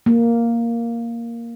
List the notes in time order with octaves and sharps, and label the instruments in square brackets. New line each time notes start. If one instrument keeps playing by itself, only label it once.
[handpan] A#3